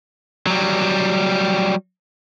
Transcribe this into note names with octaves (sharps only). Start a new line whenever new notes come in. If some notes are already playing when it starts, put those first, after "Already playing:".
F#3 G3